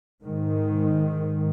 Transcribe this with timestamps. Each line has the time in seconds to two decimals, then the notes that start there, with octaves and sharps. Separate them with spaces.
0.22 G#2 D#3